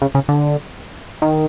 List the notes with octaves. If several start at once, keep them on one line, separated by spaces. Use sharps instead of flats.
C#3
C#3
D3
D#3